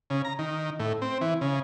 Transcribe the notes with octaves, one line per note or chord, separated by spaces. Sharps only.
C#3
A#5
D#3
A2
C4
E3
C#3